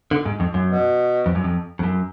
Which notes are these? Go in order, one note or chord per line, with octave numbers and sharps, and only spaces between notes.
D3
G#2
F2
F#2
B2
F2
F#2
F2
F2
F#2